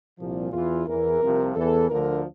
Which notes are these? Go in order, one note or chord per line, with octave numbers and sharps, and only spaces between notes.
C2 A#2 F3
E2 E3 F4
E2 E3 A#4
C2 C3 F3
E2 E3 A4
D2 D3 F3 A#4